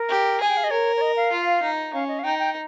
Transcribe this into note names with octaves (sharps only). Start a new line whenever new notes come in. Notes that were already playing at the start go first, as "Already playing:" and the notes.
Already playing: A#4
G4
G#4 G#5
G5
F5
D#5
A#4 C#5
C#5
D#5
F5
F4
D#4
C#4 F5
D#5
F5
D#4 G5
G5